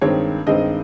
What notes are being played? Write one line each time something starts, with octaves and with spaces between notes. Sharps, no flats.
G2 D#3 G#3 C4 C#5
G2 D#3 G#3 C4 D#5